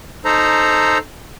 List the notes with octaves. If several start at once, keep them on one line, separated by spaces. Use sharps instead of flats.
D#4 A4 C5 A#5